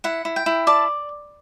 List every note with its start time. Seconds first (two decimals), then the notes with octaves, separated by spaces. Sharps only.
0.04 E4 F#5
0.25 E4
0.36 G5
0.46 E4
0.67 D5 A5